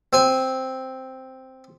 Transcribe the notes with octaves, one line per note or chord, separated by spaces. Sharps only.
C4 G#5